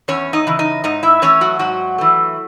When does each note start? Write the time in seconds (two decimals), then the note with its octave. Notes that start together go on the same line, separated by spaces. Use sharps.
0.08 E2 C#4 C#5
0.33 D#4 D#5
0.47 C#3 E3
0.59 D#4 D#5
0.84 G#2 D#4 D#5
1.03 E4 E5
1.22 E3 A3 C#4 C#5
1.41 F#3 F#4
1.59 G#2 F#3 F#4
1.98 E3 A3